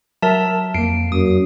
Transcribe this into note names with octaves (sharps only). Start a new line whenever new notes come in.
F#3 A#4 E5 A5
F2 A#3 C7 D7
F#2 D#6